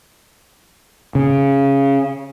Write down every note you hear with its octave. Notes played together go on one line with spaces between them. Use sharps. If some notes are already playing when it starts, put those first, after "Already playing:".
C#3